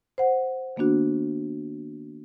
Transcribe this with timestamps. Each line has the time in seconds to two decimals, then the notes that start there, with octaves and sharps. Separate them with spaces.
0.18 C5 F#5
0.76 D#3 A#3 B3 D4 F#4